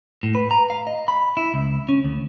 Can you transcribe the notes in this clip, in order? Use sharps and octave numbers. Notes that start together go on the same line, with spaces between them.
A2
B4
A#5
F5
D#5
B5
E4
C#2
C#4
D2